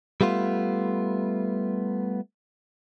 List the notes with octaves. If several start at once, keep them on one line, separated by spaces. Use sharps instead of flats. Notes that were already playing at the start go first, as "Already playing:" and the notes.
G3 A3 B3 F4